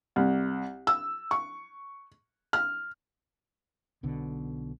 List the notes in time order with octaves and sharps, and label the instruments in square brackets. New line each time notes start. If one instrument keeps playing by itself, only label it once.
[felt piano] C2
E6
C#6
F6
[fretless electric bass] B1 B2 D3